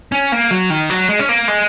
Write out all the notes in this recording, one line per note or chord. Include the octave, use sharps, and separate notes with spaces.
C#4
A#3
F#3
D#3
F#3
G#3
C#4
A#3
G#3